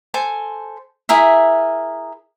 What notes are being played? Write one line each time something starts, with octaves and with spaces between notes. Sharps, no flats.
A4 C5 G#5 C6
E4 G#4 A#4 E5